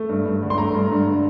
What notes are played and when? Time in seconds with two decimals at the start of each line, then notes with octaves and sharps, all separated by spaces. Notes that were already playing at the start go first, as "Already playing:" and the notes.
Already playing: A3
0.09 G2
0.26 G2
0.43 D3
0.50 C6
0.58 A3 A#5
0.75 G2
0.91 G2
1.07 D3